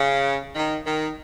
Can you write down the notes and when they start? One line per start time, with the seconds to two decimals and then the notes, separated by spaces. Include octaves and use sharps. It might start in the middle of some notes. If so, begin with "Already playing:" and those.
Already playing: C#3
0.55 D#3
0.87 D#3